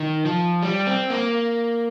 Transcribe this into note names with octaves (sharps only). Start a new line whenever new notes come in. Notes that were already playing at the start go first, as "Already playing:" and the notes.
Already playing: D#3
F3
G3
C4
A#3